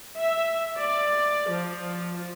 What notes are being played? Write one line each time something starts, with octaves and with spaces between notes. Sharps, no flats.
E5
D5
F3